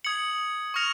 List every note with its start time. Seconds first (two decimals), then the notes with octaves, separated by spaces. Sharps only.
0.04 D#6 G#6 C#7 F#7
0.74 C#6 F6 A#6 C#7 F7